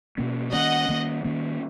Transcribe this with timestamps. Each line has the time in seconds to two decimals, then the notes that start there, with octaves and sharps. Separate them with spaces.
0.18 B2 A#3 C#4
0.53 D#3 A#3 C#4 D#5 F#5
0.89 D#3 A#3 C#4
1.24 D#3 A#3 C#4